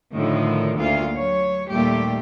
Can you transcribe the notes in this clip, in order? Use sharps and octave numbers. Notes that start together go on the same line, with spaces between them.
A2 D3 D#3 F3
D2 A#3 F4 F5
F#3 C#5
D#2 A#2 G3 A3 G4